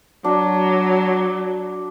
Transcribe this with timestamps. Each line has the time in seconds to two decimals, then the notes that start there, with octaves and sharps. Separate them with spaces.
0.24 F#3 D4 F#4